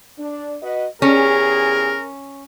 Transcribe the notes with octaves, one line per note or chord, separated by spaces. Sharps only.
D4
F#4 B4 D#5
E2 C#4 G4 G#4 A#4